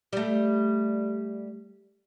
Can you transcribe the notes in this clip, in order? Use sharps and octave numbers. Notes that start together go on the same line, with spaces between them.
G3 A3